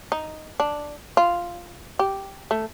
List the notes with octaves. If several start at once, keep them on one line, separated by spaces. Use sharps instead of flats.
D#4
D4
F4
G4
A3